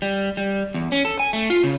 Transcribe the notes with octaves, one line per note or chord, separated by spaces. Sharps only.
G3
G3
E2
C#4
A4
G#5
A3
F4
C#3